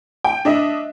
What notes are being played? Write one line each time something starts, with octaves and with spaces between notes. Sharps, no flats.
G5
D4 D#5 E5